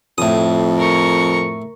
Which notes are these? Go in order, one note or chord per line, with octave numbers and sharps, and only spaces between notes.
F2 A2 D#6
A#4 C#6